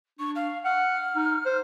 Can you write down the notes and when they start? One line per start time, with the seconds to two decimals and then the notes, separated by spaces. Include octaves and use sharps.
0.19 D4 C#6
0.35 F5
0.65 F#5 F6
1.16 D#4
1.46 C5